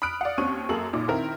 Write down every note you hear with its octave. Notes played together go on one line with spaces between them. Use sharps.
B5 D#6 F6 F#6 D7
D5 F5 F#5
D#2 C4 C#4 C#6 D#7
F#2 A#3 G#4 A4 A#5 F#7
F#1 A#2 D#4 D6
D#3 C4 E4 A#4